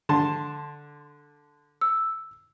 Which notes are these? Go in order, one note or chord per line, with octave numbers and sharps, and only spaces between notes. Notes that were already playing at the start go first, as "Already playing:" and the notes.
D3 A5 C6
E6